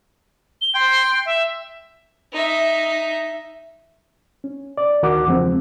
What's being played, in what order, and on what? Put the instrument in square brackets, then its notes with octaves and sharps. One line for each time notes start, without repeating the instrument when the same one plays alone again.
[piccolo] G7
[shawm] G5 [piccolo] C6
[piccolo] E5
[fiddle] D#4 E5
[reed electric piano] C#4
D5
D2 D#3 F#4 A#4 F#5 D6
E2 G2 C#3 F3 G#3 C4